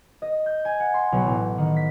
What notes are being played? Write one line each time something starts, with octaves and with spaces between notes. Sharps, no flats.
D#5
G6
G#5
F#5
C6
B1
A1
D#3
B6